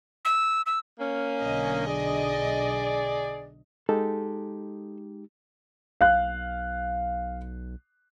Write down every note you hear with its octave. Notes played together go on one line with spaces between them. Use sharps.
E6
E6
A#3 C#4
B1 D3 D#5
G#4 D5
G#3 D#4 G4 A4
B1 F5 F#6